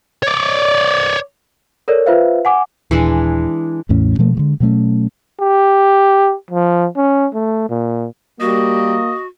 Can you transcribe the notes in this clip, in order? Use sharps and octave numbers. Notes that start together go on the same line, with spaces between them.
C#5 D5
A4 A#4 C#5 D5
F4 B4 C5 E5 F5
F#5 G#5 D6
D#1 E3 G#3 D4
A1 E2 A2 C#4
B2 F3 A3 A#3
D3 F#3 G#3
B2 F#3 A3 C#4
G4
F3
C#4
A3
A#2
G3 A#3 F#4 D#5